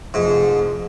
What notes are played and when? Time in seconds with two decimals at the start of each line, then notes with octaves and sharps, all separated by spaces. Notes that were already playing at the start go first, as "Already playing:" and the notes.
0.14 F1 G#2 F3